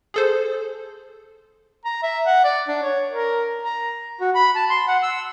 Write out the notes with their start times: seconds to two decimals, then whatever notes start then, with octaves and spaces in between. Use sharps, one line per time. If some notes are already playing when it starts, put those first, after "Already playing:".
0.14 G#4 A4 C5
1.85 A#5
2.03 E5
2.26 F#5
2.44 D5
2.68 D4
2.82 C#5
3.10 A#4
3.63 A#5
4.21 F#4
4.35 B5
4.55 A5
4.70 C6
4.88 F#5
5.03 E6